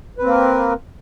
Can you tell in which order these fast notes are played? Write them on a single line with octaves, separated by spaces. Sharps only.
B4 C4 A#3 A#4